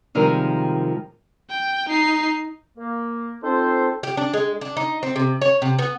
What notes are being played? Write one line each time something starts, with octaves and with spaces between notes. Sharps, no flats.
C3 D#3 F3 G3 G#3 A#4
G5
D#4 C7
A#3
C4 D#4 F4 A4 C5
G4
D4
G#3
D4
D#4
C4
C3
C#5
C3
B3